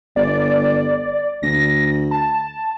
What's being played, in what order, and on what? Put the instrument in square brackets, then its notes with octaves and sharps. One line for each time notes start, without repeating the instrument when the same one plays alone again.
[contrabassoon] G1 [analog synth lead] D5
[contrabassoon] D2 [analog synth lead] A#6
[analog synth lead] A5